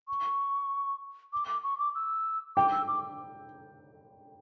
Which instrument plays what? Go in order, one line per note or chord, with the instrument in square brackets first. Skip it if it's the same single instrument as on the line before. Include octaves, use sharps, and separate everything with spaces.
[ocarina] C#6
D6
D6
C#6
D6
E6
[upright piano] G5 [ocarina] D6
[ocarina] E6
D6